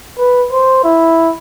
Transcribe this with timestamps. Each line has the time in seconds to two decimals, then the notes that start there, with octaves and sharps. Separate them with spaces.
0.18 B4
0.52 C5
0.84 E4